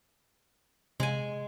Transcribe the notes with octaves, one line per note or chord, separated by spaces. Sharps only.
C3 G#3 G#5